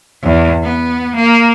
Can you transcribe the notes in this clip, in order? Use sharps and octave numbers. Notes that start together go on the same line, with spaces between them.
E2
B3
A#3